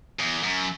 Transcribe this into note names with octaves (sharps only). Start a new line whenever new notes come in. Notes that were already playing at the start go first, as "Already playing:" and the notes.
E2
F#2